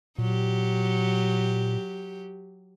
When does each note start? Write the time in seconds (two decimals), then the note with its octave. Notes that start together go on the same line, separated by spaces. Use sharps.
0.18 A#2 F#3 G4